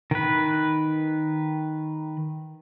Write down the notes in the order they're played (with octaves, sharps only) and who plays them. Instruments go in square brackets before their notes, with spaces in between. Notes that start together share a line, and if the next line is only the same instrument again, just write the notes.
[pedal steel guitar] D#3 B4